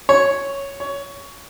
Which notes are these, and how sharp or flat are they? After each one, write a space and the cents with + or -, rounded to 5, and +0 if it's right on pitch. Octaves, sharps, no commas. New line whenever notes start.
C#5 +0
C#5 +15